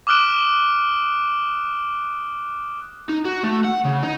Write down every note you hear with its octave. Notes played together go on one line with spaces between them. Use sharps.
D6 D#6 F6 F#6 D7 E7
D#4
F#4
A3
F#5
C#3
D#4